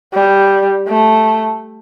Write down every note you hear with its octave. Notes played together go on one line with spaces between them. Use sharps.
G3
A3